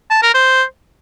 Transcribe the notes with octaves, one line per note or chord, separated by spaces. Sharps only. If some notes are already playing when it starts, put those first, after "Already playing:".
A5
A#4
C5